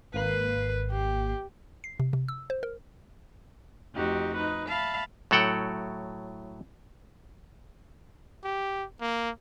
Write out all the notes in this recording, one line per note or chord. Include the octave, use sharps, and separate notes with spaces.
G#1 A#3 B4 C7
G4
C7
C3
C3
E6
C5
A#4
F2 A3 D#4 F#4 G4
D#4 B4
E5 F5 A5 B5
A2 F#3 A4 F#5 G5
G4
A#3